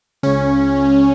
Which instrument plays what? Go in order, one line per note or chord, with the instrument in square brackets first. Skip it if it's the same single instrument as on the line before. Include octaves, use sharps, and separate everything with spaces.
[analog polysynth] C#2 C#3 C#4